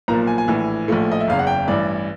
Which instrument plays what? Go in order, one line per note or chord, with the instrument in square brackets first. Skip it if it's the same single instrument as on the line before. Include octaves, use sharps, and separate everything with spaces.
[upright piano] B1 A#2 F3 A#3 A#5
G#5
G#5
A#1 A2 E3
A#1 A2 F3 A3
D#5
E5
F#1 E2 C#3 F5
F#5
G5
A1 G2 E3 D5